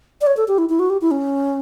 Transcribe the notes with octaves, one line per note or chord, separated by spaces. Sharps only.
D5
C#5
A4
G4
E4
E4
F#4
G4
E4
C#4